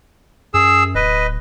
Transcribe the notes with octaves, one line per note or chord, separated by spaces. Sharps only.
F#2 G#4 E6
D1 B4 D#5